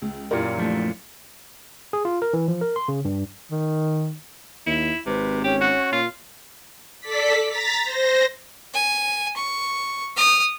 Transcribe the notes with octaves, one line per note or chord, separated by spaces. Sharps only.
C#2
F#2 A#2 E4 G4 A#4 D5
F3 A3 D4
G#4
F4
A#4
E3
F3
A#4
C6
C#3
G2
D#3
D#2 E4
G#1 C3 B4
C#4 G4
F#4
A#2 F4
A4 D5 B6
A#5 A6 B6
C5 A#6
G#5
C#6
D#6 F6